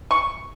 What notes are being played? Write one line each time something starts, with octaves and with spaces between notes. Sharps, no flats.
C#6